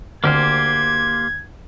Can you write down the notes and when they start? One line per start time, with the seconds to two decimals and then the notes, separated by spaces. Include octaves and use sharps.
0.24 D2 A#3 G4 C5 F6 G#6